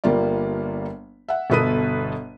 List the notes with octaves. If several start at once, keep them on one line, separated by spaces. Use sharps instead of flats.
G1 G3 A#3 F4 D5
E5 F#5
G1 B2 A4 B4 D#6 D#7